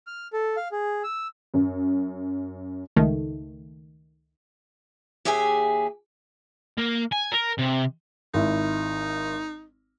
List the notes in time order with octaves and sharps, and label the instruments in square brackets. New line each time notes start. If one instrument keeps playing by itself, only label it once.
[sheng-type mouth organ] F6
A4
F5
G#4
E6
[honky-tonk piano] F#2
[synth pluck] C#2 D#3 A3
[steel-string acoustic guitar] D#2 G4 G#4 E5 G#5
[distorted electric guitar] A#3
G#5
A#4
C3
[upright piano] G#1 E4 [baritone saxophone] D#4